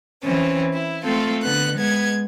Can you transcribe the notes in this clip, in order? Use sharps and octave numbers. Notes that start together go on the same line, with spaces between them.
E3 C4 C#4
E4
A3 C4 F4 A4
D3 B3 F#6
G#3 B3 G#6